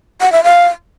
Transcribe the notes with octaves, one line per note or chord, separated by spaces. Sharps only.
F#5
E5
F5